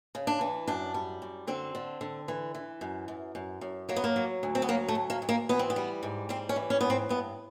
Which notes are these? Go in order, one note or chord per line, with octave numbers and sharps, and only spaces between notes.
C#3
D4
E3
F#2 D4
G3
F#2
D3 C4
D3
D3
E3
E3
F#2
F#2
F#2
F#2
F#3 A#3
B3
A#3
F#3
D2
C4
B3
F#3 A#3
A3
D2
A#3
D2
A#3
E3 B3
C4
B3
G3
G#2
G3 C4
C#4
E3
C#4
G#2 B3
C4
G2 B3